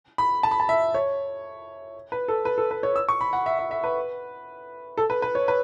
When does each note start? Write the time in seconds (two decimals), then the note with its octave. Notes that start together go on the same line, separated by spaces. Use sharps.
0.18 B5
0.43 A5
0.51 B5
0.60 A5
0.69 E5
0.94 C#5
2.12 B4
2.28 A4
2.45 B4
2.58 A4
2.71 B4
2.83 C#5
2.96 E6
3.09 C#6
3.21 B5
3.33 F#5
3.46 E5
3.59 E5
3.71 E5
3.84 B4
4.97 A4
5.10 B4
5.22 B4
5.35 C#5
5.48 B4